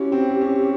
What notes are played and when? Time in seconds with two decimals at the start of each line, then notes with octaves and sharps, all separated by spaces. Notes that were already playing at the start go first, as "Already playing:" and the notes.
Already playing: C#4 E4 F#4 G4
0.12 C4
0.41 C#4